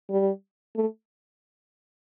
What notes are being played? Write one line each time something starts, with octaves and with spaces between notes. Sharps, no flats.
G3
A3